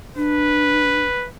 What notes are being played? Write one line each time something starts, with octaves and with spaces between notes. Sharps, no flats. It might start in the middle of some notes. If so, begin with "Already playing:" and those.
D4 B4